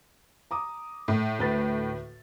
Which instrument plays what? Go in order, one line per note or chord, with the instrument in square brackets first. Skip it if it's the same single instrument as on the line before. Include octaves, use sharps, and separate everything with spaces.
[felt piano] A#5 D6 D#6
[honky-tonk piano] A2
[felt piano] D2 B4 A6